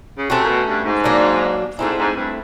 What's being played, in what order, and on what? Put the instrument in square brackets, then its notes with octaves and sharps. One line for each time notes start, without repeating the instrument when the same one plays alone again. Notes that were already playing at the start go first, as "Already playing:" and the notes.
[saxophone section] C#3
[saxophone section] C3 [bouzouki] A3 C#4 F#4
[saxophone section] A#2
B2
G2
G#2
[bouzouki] F#3 A#3 D4
[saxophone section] G#2 [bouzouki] A3 C4 E4
[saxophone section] G#2
G2